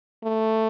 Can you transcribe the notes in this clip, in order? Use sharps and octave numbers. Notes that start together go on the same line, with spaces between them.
A3